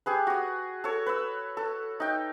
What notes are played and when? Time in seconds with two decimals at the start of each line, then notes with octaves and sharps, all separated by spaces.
0.06 G4 G#4 B4
0.27 F#4 D#6
0.84 A4 C#5
1.06 B4 E6
1.57 A4
2.00 D#4 G5